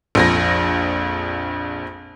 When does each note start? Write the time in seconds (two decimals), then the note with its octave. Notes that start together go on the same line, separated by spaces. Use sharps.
0.15 A#1 F2 A#6